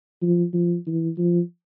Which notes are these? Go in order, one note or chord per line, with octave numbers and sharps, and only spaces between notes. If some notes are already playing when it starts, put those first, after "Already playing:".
F3
F3
E3
F3